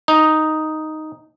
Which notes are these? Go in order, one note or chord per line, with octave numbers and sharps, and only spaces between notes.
D#4